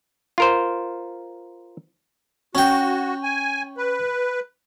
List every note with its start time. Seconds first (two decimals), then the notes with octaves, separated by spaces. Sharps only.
0.38 F4 A#4 C5
2.55 C#4 F#4 G5
3.23 G#5
3.77 B4